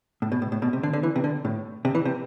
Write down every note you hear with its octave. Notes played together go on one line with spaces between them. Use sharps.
A2
B2
A2
A2
B2
C3
D3
D3
E3
C3
D3
A2
C3
E3
C3